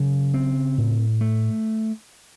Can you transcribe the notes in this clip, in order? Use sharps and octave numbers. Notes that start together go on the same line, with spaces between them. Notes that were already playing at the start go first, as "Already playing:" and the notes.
Already playing: C#3 F#3
C4
A2
A3